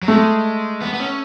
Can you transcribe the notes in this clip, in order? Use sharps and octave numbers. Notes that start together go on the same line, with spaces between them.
F#3
G#3 A3
B3
B3
C#4